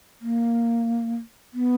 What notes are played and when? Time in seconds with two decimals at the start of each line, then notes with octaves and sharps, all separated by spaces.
0.21 A#3
1.54 B3